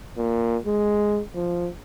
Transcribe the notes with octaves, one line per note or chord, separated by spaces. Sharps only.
A#2
G#3
F3